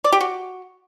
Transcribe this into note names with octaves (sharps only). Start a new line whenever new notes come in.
D5
G4
F#4